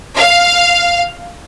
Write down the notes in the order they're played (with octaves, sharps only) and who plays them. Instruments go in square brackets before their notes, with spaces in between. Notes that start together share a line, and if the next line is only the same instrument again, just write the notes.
[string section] F5